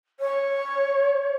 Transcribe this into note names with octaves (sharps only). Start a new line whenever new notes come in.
C#5